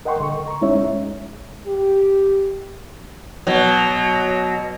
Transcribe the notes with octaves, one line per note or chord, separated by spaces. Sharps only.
A#4 D#5 F#5 G5 C6 C#6
D3 A4 C#6
C#6
A#5 C#6
G#3 C#4 D#4 E4 C#5 E5
G#3
G4
B2 F#3